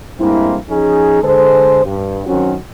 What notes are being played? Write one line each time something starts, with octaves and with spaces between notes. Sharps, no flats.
G2 G#3 A#3 C4 E4
F3 C#4 D#4 G#4
D3 G#3 G#4 A4 C5
G2
F#2 D#3 F#3 C4 C#4 F#4